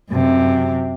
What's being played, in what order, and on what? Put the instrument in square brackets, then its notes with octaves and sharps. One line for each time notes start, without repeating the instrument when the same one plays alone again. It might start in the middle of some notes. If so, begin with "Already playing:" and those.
[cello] F#2 C3